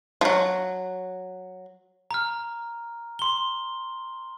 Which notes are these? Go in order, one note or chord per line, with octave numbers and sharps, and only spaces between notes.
F3 F#3
A#5 F6
C6 G7